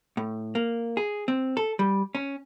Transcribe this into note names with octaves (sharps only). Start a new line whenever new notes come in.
A2
A#3
G#4
C4
A4
G3
C#4